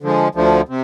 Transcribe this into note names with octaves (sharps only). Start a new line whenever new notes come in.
D3 F3 G#3
D2 D3 F3
C3